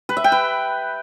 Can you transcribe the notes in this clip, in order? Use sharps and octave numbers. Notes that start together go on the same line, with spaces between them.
B4
E5
G5
B4